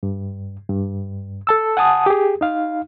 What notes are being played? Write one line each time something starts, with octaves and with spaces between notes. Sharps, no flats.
G2
G2
A4 A5 E6
F#5 G#5 A5 D#6
G4 G#4
D#4 F5